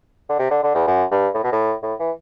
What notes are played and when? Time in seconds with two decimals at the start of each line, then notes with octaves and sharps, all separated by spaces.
0.29 D3
0.39 C3
0.50 D3
0.63 D3
0.74 E2
0.87 F#2
1.11 G2
1.34 A2
1.44 B2
1.52 A2
1.83 A2
2.00 E3